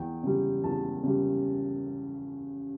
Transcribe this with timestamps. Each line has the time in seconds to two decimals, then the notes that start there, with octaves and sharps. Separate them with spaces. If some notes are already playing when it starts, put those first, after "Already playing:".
Already playing: E2 G5
0.23 C#3 G3
0.64 E2 A5
1.03 C#3 G3